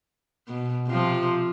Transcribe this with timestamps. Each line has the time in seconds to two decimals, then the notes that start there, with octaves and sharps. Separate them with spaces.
0.48 B2
0.87 C3 F3